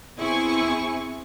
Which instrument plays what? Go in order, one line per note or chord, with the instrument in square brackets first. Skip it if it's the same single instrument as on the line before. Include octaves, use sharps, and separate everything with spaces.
[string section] E2 C4 E4 G#4 G#5 C#6